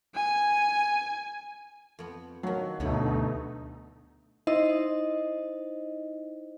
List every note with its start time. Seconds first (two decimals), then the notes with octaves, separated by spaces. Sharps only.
0.15 G#5
1.99 F2 B3
2.43 D#3 F3 F#3
2.80 D2 G2 B2 D3 A3 B3 D#4
4.47 D#4 E4 C5 D#5